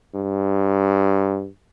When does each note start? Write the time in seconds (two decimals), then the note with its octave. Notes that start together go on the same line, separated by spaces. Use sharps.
0.15 G2